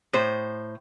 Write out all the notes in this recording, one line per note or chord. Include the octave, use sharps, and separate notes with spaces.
A2 C5